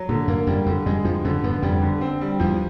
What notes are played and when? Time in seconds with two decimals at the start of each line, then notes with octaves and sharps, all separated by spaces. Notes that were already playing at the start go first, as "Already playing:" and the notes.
Already playing: F#3
0.09 A#2 D3
0.28 F#2 A#3
0.47 F2 G3
0.66 F2 D3
0.86 F2 G#3
1.04 F2 F3
1.25 F2 D3
1.43 F#2 B3
1.62 F2 G3
1.82 D3
2.01 C4
2.21 G3
2.40 E2 F3